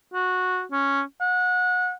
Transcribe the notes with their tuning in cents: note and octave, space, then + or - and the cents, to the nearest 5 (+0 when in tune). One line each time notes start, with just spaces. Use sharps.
F#4 -15
C#4 +0
F#5 -25